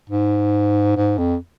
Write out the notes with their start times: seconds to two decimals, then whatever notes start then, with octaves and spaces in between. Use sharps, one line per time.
0.09 G#2
0.97 G#2
1.18 F2